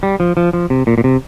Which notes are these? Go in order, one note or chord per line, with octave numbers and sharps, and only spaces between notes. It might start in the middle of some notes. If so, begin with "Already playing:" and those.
G3
F3
F3
F3
C3
A#2
A#2
C3